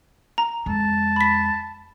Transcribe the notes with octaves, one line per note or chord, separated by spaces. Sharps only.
A#5
F2 G#3 A5
B5 B6